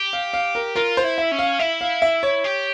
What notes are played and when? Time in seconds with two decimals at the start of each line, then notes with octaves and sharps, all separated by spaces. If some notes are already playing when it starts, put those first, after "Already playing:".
Already playing: G4
0.13 F5
0.33 F5
0.55 A#4
0.76 F4 A#4
0.97 C5
1.04 E4
1.18 E5
1.32 C#4
1.39 F5
1.59 E4 E5
1.81 F5
2.02 E5
2.23 C#5
2.44 G4